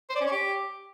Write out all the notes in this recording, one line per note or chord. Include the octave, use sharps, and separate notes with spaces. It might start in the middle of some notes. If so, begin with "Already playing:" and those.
C5
D5
C#4
C#5
G4